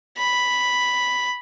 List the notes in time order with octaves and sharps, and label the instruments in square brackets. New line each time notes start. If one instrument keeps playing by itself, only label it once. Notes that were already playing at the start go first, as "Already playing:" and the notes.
[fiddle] B5